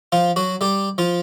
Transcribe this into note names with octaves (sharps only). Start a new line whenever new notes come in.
F3 F4
F#3 F#4
G3 G4
F3 F4